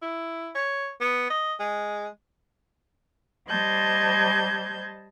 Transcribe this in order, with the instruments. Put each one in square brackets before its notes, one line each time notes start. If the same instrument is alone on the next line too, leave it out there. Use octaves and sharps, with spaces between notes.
[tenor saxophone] E4
C#5
B3
D#5
G#3
[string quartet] G3 C5 D#5 A5 G6 G#6